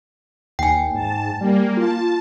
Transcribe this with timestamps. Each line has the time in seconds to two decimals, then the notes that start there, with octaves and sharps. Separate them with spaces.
0.59 D#2 G5 G#5
0.94 G#2 A5
1.41 G3 A#3
1.77 F4 A5